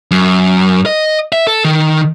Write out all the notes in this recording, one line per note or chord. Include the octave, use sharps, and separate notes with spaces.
F#2
D#5
E5
A4
D#3